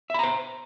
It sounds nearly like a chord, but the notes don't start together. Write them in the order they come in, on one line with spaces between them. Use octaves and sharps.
E5 B5 A#5 C5